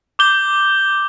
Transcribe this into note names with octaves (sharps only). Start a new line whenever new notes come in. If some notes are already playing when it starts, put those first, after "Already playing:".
D6 G6 G7